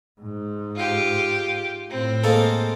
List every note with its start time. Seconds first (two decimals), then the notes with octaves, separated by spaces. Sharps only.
0.21 G#2
0.75 F4 G4
1.90 A2 C4
2.24 G#3 A#3 A4